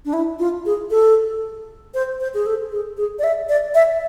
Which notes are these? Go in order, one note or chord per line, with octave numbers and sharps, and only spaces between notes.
D4
E4
F4
G#4
A4
C5
C5
G#4
A4
G#4
G#4
D5
E5
D5
E5